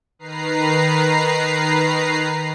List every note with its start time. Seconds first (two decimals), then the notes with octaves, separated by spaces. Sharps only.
0.19 D#3 B4 A#5 C7